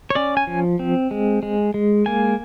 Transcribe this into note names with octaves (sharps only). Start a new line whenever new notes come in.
C#5
C#4 D5
G#5
F3
C4
G#3
G#3
G#3
A#3 G#5